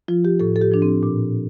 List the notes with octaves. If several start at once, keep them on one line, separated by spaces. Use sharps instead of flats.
F3 F4
G4
A2 A4
A4
G4
F3 D4
C4
A#2